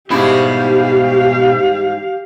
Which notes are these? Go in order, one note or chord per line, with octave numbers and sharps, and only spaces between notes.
G#2 B2 G3 E4 G4 F5